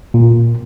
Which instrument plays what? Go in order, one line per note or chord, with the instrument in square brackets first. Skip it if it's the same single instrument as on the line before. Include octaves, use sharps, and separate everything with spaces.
[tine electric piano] A#2